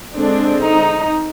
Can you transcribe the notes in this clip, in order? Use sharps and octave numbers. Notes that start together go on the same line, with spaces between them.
D3 G#3 C4 D4
D#4